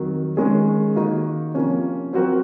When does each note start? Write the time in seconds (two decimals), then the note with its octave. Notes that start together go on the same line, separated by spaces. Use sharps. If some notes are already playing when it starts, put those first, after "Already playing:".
Already playing: F2 D#3 F#3
0.37 D#3 G#3 C#4 G#4
0.96 D#3 A#3 D#4 F#4
1.55 C3 F3 A#3 C#4
2.13 F#3 C4 F#4 A#4